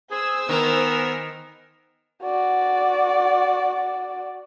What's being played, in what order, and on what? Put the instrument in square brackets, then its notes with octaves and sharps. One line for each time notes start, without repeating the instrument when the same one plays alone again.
[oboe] G#4 [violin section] C5 G#5 E6
[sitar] D#3 [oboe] B3 [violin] A#4
[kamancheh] F#4 D5